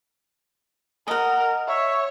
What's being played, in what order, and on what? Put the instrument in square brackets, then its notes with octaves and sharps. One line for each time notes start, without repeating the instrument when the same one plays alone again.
[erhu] A#4 [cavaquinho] D#5 F#5
[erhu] C#5 [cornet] E5